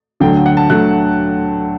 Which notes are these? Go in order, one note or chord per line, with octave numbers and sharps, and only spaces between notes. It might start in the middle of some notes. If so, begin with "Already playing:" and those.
D2 D3 F#3 A3 G5
F#5
A5
D3 F#3 A3 F#6